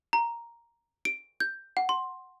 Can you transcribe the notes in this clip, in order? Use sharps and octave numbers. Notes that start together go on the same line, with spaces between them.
A#5
D7
G6
F#5
C6